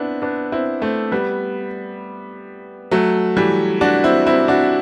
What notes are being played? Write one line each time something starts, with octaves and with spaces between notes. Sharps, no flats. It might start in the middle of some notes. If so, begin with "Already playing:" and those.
Already playing: B3 C4 D4 E4
B3 D4
C4 E4
A3 C4
G3 B3
F#3 A3
E3 G3
D4 F#4
C4 E4
C4 E4
D4 F#4